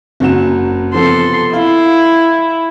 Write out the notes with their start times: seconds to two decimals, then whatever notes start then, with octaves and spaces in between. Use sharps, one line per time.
0.20 F#1 F#3 E7
0.94 C3 F3 B3 A4 C6
1.53 E4 F5